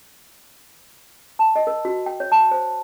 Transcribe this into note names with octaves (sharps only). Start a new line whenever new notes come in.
A5
D#5
A#4
F#4
G5
C#5
A5
C5